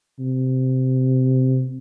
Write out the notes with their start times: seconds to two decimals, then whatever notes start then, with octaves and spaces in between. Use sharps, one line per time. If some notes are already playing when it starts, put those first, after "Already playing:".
0.19 C3